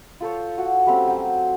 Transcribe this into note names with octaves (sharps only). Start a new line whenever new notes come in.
F4 A4 C5 C#5
F#4
G3 A3 C4 C#4
F#3 C5